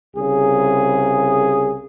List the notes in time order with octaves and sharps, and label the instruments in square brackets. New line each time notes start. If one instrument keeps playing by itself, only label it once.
[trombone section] C2 C#3 G#4